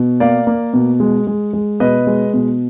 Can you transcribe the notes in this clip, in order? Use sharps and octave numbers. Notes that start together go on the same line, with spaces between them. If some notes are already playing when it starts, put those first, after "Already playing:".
Already playing: B2
A#3 D5 F5
A#3
B2
G#3
G#3
G#3
B2 B4 D#5
G#3
B2